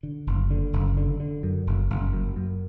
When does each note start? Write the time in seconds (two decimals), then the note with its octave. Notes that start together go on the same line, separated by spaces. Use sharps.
0.03 D3
0.27 F#1
0.51 D3
0.73 F#1
0.97 D3
1.20 D3
1.43 F#2
1.67 F#1
1.90 F#1
2.13 F#2
2.36 F#2